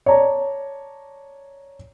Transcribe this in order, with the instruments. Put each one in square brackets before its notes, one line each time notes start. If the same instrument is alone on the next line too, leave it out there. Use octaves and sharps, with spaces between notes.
[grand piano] C#5 D5 A5 A#5